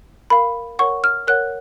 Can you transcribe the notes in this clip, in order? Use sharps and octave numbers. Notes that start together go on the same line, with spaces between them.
A#4 F5 B5
A#4 C#5 F#5 C#6
F6
A#4 C#5 F#5 F#6